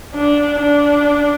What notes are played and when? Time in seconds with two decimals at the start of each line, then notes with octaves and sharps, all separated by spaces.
0.15 D4
0.59 D4